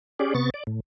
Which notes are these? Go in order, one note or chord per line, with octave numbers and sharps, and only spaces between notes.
C#4 G4 G#4 D5
C3 B3 C#6 A6
D5
A2